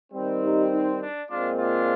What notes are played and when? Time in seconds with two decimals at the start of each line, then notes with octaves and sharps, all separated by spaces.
0.12 D#3 G3 C4
0.43 D#4 G4
0.72 D#4
1.01 D4
1.30 A#2 G#3 C4 D4 F4
1.59 D4 F4